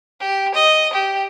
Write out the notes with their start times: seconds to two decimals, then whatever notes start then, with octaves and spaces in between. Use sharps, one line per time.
0.20 G4
0.55 D#5
0.93 G4